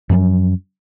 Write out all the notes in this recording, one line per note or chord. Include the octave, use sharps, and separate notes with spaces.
F#2 F3 F#3 C#4